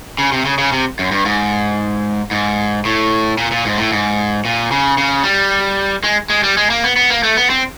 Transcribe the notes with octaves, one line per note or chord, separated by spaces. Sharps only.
C#3
C3
C#3
C#3
C3
F#2
G2
G#2
G#2
A2
A#2
A#2
G#2
A2
G#2
A#2
C#3
C#3
G3
G#3
G#3
G3
G#3
A#3
B3
B3
A#3
A3
B3
C4